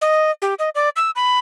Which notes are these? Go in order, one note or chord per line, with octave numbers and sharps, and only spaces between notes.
D#5
G4
D#5
D5
E6
B5